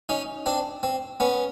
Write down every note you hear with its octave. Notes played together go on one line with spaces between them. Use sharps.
C#4 D#4
C4 D4
C4
B3 C#4